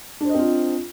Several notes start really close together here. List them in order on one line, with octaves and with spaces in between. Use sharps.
D4 C5 D#5 C4 F4